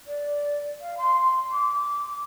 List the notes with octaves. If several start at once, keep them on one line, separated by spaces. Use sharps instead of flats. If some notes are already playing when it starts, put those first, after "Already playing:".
D5
F5
C6
D6